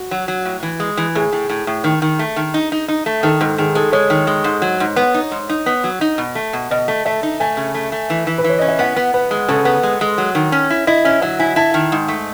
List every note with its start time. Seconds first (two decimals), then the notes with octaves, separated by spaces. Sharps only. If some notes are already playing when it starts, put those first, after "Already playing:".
Already playing: F#4
0.11 F#3
0.28 F#3
0.45 A2
0.63 E3
0.80 G#3
0.97 E3
1.15 A2 G#4
1.33 A2
1.50 A2
1.67 A2
1.84 D#3
2.02 D#3
2.19 A3
2.36 D#3
2.54 D#4
2.72 D#4
2.88 D#4
3.06 A3
3.23 D#3 A4
3.41 G#2 A4
3.58 D#3 G#4
3.75 G#3 A4
3.92 G#3 C#5
4.10 D#3
4.27 G#3
4.44 G#2
4.62 F#3
4.80 G#2
4.96 B3
5.14 D#4
5.31 G#2
5.49 D#4
5.66 B3
5.84 F#3
6.01 D#4
6.18 B2
6.35 A3
6.53 B2
6.71 B2 D#5
6.88 A3
7.05 A3 E5
7.23 D#4
7.40 A3 G#5
7.57 C#3
7.75 A3
7.92 A3
8.10 E3
8.27 E3
8.38 B4
8.44 E3 C#5
8.58 C#4 D#5
8.69 E5
8.79 B3 F#5
8.96 B3
9.14 B3 B4
9.31 G#3
9.48 C#3 A4
9.65 B3
9.83 G#3
10.01 G#3
10.18 F#3
10.35 D#3
10.52 C#4
10.70 E4
10.87 E4 D#5
11.05 C#4 E5
11.22 F#3 E5
11.39 E4 G#5
11.56 E4 A5
11.74 D#3
11.92 G#2
12.08 A3